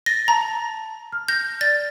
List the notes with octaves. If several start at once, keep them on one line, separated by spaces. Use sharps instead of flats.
A6 A#6
A5 A#5
F6
G6 A#6
D5 A6